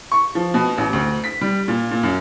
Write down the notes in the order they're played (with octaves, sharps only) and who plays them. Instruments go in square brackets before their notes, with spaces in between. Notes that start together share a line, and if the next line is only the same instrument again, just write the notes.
[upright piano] C#6
F3
B2
A1
D2
B6
G3
A#2
A#2
F#2